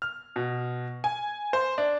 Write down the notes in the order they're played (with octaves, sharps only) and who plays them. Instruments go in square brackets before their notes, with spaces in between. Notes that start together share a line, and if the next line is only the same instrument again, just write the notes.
[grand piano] F6
B2
G#5
C5
D4